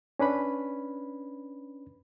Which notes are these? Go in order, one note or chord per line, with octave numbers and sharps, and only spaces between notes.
C#4 D4 B4 B5